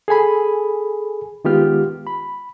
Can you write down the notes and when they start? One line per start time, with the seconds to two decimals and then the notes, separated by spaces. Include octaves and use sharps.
0.08 G#4 A4 G#5 B5
1.45 D#3 G#3 B3 F4 G4 F6
2.07 B5